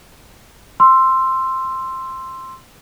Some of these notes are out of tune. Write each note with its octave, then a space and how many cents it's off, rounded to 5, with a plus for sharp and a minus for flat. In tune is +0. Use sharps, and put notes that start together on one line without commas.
C6 +0 E6 +15